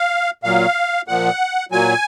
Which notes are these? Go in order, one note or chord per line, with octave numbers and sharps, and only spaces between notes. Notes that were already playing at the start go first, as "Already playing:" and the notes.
Already playing: F5
A#2 F#3 F5
A#2 F3 F#5
A#2 F#3 G#5